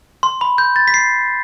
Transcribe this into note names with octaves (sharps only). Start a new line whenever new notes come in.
C6
B5
G6
A6
B6
C7